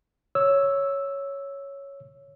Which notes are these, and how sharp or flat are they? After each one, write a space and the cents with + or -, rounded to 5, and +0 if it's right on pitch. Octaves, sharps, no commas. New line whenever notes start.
C#5 +0 E6 +0